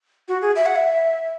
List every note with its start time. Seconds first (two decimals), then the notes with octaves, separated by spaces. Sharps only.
0.28 F#4
0.42 G#4
0.56 E5
0.66 F#5
0.75 E5